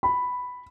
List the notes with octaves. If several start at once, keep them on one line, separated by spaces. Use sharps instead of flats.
B5